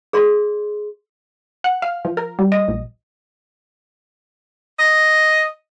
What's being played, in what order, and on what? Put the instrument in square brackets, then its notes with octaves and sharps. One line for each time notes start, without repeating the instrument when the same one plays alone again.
[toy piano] G#4 D5 C6
[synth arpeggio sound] F#5
F5
F3
A#4
G3
D#5
A#1
[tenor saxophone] D#5